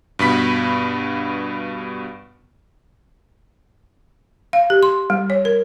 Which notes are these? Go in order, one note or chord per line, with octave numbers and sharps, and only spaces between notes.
G2 B2 B5 B6
F5
G4
C6
G3
C#5
A#4